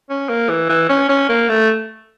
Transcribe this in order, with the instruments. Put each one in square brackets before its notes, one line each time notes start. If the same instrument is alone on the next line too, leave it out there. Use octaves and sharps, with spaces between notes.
[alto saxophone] C#4
A#3
E3
E3
C#4
C#4
A#3
A3